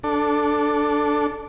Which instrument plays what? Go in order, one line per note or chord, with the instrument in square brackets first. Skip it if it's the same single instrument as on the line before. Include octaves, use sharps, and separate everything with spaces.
[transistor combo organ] D4 A4